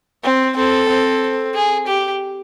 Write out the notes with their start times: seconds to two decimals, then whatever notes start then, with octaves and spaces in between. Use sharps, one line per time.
0.23 C4
0.56 C4 A4
0.89 C4
1.54 G#4
1.87 G4